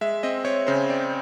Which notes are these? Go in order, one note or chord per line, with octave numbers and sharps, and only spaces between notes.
G#3 E5
C4 D#5
C4 C#5
C#3 C5
C4 D5